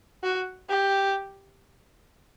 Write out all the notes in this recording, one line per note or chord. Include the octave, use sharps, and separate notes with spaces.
F#4
G4